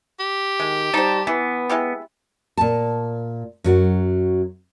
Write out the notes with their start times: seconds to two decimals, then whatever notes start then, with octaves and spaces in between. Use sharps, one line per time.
0.19 G4
0.60 D#3 G#3
0.94 G3 D#4 C5 A5
1.27 E3 B3 B4
1.69 G#3 E4 G4
2.57 A#2 A5
3.64 F#2 F#3 F#4